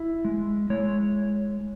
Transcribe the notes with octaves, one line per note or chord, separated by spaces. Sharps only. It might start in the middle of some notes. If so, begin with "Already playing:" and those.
Already playing: E4
G#3
G#3 C#5